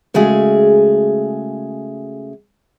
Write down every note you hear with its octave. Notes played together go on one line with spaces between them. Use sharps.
C#3 G#3 A3 F#4 G#4